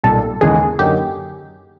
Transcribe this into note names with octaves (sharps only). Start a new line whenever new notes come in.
B1 A#2 G3 A4
D#2 C#3 E3 G#3 B3 G#4
F#2 D3 F#3 A#3 D#4 G4